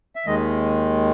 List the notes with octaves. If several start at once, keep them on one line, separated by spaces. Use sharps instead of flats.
E5
D#2 D#3 G#3 D#5